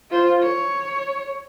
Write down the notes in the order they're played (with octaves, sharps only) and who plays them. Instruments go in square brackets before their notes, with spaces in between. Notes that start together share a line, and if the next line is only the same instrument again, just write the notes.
[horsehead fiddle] F4 C5
C#5